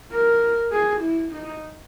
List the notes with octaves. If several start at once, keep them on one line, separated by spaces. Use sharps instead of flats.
A#4
G#4
E4
D#4